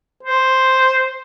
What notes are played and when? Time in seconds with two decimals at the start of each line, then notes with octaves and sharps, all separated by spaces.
0.23 C5